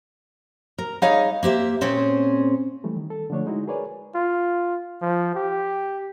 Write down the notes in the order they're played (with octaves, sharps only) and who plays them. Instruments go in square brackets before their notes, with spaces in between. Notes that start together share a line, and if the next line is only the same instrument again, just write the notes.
[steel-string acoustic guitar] A#4
G3 D#4 G#4 C#5 D#5 F5
A#3 G4 C5 E5
A#2 C4 C#4 G#4 C5
[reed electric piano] E3 G3 A3
D#3
A4
D3 F3 A3 D4 C#5
G#3 D#4 E4 F#4
G#4 A#4 B4 C#5 D5 G#5
[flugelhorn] F4
F3
G4